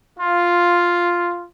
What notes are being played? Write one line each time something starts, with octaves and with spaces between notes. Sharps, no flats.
F4